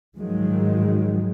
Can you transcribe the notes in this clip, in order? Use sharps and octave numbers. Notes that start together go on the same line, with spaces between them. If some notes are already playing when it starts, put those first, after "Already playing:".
G#2 D#3 F3 F#3 G#3